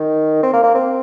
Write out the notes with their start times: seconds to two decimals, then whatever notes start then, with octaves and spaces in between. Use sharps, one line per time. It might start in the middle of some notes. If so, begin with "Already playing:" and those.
Already playing: D#3
0.43 C4
0.53 A#3
0.63 A#3
0.74 C4